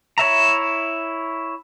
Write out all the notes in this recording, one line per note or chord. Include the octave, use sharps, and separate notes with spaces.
E4 C#5 E5 A#5